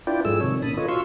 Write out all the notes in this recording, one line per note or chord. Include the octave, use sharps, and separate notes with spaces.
D4 E4 F4 B4 D5 G5
G#2 F3 G#3 G#4 A4 E6
C3 D#3 C#5
A#2 D#3 C#4 A5 B5 D#6
F4 A4 B4 C#5 D#5
F4 F#4 F5 C6 C#6 E6